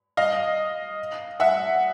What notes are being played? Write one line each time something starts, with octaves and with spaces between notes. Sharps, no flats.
D#5 F5
E5 F#5